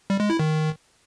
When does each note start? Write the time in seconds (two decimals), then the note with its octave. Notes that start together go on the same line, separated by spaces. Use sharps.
0.10 G3
0.20 G#3
0.30 E4
0.39 D#3